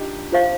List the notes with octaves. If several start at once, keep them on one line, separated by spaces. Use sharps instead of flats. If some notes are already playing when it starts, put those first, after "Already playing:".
Already playing: D4 D#4 F4 G4
F4 C5 F5